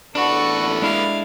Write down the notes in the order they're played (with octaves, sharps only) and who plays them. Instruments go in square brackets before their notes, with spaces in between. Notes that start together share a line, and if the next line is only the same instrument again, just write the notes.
[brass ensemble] A1 E2 A4 [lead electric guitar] A#3 B4 [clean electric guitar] D4 [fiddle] F#4
[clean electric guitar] G#3 D4 E4 [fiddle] F5